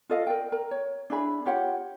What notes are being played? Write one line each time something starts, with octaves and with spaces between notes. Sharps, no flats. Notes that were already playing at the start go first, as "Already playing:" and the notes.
F4 A4 D#5 F5
A#4 D5 G5
A#4 A#5
C#5
D4 E4 G#4 B5
F4 G4 C#5 F#5